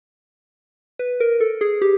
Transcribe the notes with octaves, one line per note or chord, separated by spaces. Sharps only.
B4
A#4
A4
G#4
G4